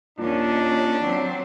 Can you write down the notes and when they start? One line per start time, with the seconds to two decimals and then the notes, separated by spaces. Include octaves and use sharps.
0.18 D#2 A#2 C#4 D4
1.04 F#3 C4